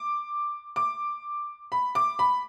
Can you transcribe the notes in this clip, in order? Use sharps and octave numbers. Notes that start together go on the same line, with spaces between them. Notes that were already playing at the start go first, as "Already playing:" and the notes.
Already playing: D6
D6
B5
D6
B5